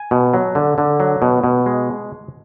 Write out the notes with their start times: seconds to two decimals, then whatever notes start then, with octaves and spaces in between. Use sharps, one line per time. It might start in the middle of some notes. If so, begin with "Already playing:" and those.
Already playing: G#5
0.11 B2
0.34 F#3
0.55 D3
0.78 D3
1.00 F#3
1.22 B2
1.44 B2
1.66 G#3